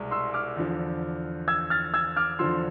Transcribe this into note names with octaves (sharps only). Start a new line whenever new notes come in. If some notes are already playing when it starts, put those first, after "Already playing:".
Already playing: C2 B2 G#3
C6 E6
D6 F6
E2 D3 F3
E6 G#6
F6 A6
E6 G#6
D6 F6
E2 D3 F3 C6 E6